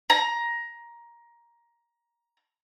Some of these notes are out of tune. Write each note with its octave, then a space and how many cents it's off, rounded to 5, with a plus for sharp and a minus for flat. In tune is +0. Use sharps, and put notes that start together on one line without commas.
A#5 +15